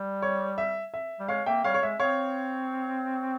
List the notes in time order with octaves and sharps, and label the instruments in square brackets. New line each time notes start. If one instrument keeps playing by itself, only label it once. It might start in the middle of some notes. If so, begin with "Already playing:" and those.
Already playing: [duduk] G3
[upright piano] C#5
E5
E5
[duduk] G3
[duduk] G#3 [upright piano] C#5 F5
[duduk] A#3 [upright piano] E5 G5
[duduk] G3 [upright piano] C#5 F5
[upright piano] C#5
[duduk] G#3 [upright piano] E5
[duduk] C4 [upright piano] C#5 F5